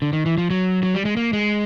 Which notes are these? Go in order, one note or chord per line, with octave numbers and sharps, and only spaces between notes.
D3
D#3
E3
F3
F#3
F#3
G3
G#3
A#3
G#3